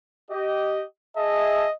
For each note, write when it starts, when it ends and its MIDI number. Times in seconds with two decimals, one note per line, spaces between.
0.31 0.84 67
0.31 0.84 75
1.17 1.67 68
1.17 1.74 75
1.17 1.67 76
1.17 1.67 81